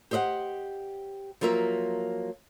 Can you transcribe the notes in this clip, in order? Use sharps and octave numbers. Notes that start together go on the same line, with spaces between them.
G4 C5 D#5 E5 F#5
F3 F#3 A#3 A#4 E5